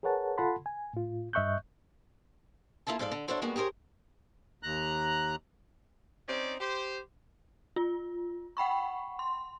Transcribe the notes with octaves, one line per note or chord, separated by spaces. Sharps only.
G#4 A#4 B4 C#5 F#5 A5
F4 A4 F#5 A5 B5 C6
G#5
A2 F4
G2 D#5 E5 C#6 F#6 G6
A#3 E4 F4 A4 A5
G#2 F3 A4 D5 F5
D3
D4 E4 F#4 A4 C5 C#5
G3 G#3 A#3 B3 F#4
G4 G#4 A#4 C5 C#5
D#2 A#5 F#6
C4 C#4 D#4 D5
G4 C5
F4
F#5 G5 B5 C#6
C6